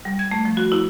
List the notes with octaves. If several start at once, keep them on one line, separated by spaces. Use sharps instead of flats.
G3
G#6
A3
F3
F#4
E4